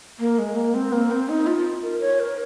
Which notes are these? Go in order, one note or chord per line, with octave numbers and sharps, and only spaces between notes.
A#3
G#3
A#3
C4
A#3
C4
D#4
F4
A#4
C#5
A#4